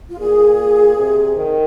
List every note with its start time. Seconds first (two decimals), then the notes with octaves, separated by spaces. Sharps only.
0.09 F4
0.18 A#2 G#4
0.97 C3
1.36 D#3